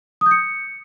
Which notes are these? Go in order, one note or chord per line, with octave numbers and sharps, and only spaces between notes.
D#6
G6
C#7